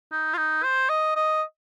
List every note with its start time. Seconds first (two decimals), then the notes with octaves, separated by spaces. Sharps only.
0.12 D#4
0.34 F4
0.37 D#4
0.64 C5
0.89 D#5
1.15 D#5